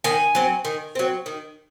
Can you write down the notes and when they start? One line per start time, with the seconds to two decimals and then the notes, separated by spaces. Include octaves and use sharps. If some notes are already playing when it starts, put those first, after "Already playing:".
0.04 D#3 G#5
0.35 F#3 C4
0.65 D#3
0.95 F#3 C4
1.26 D#3